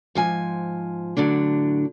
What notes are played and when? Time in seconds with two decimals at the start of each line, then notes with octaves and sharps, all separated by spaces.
0.15 G#2 F3 G#5
1.17 A2 D3 F#3 D4